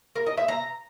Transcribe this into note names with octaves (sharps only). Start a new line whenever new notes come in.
A#4
D#5
E5
A#5